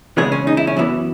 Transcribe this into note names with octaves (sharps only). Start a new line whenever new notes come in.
C#3 E3 G#3 B3 G#4
C#4
D#4
E4
C#4
F#2 E3 B3 E4